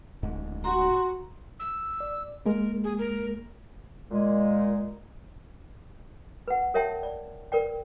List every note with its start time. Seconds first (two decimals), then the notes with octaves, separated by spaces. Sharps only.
0.23 D1 G#2
0.64 F#4 A#5 C6
1.60 E6
2.00 D5
2.46 G#3 A#3 A#4
2.84 G#4
2.99 A#4
4.11 A#2 G#3
6.48 B4 F#5
6.74 A#4 C#5 E5 G5 A5
7.03 D5
7.52 A#4 B4 D5 G5